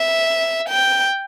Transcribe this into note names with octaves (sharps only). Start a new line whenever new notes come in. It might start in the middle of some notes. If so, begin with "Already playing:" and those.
Already playing: E5
G5